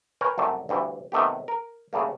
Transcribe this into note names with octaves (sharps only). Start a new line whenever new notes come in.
A#4 B4 C#5 G5 G#5 A#5
C2 F#2 A3 C4 D5 A5
D2 G2 E3 G3
C3 D#3 A3 B3 G4
A#4
C#3 G3 A3 A#3